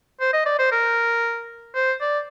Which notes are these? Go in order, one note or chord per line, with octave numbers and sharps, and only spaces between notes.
C5
D#5
D5
C5
A#4
C5
D5